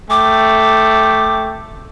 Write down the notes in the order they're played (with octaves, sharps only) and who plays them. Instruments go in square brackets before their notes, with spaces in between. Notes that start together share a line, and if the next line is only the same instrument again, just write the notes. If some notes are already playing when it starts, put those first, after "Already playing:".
[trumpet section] A3 G5 [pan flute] D6